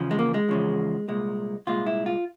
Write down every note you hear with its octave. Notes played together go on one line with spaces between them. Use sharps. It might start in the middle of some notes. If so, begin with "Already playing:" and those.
Already playing: E2 C#3 F3
G#3
A#3
G#3
E2 C#3 F3
C2 A#2 G#3
C2 A#2 G#3 F4
E4
F4